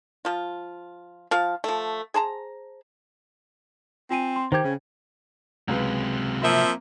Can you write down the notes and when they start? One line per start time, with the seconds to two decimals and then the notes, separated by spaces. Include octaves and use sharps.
0.25 F3 F4
1.31 F3 F4 F5
1.64 F3 A3
2.14 G#4 C5 A5 A#5
4.10 C4 F4 G#5 D#7
4.36 C6
4.52 D#3 G4 C5 G5 G#6
4.64 C#3 C#4
5.68 C#2 C3 F#3 G#3 B4
6.42 F3 A#3 C4 E5